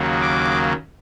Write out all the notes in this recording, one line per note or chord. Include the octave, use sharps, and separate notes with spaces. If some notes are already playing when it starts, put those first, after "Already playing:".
Already playing: D#2 C#3 F#3 A#3
D6